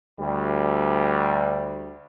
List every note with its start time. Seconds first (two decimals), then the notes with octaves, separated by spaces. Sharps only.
0.20 D2 G3